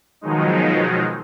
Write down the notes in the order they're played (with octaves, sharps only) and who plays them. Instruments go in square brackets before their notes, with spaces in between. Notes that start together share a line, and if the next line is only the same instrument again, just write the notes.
[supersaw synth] B2 D#3 F3 F#3 G#3 D#4